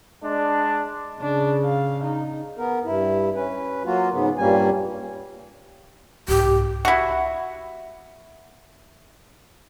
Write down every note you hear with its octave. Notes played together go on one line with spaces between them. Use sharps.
G#3 D4
C#3 D4
F5
D#4
B3 A#4
G2 E4
C#4 B4
F#3 A#3 F4 F#4
G#2 C#3 B3
G2 A#2 G3 A#3 C#4 G#5
C2 G#2 G4
E4 F#4